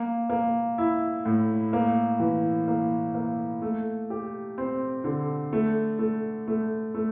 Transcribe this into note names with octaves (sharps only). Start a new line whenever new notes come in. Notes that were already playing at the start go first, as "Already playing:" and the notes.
Already playing: A#3
A#3
E4
A2
A#3
E3
A#3
A#3
A3
G4
C4
D3
A3
A3
A3
A3